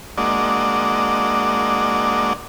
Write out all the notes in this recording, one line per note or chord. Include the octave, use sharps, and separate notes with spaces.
G#3 A#3 D4 F#4 D5 D#5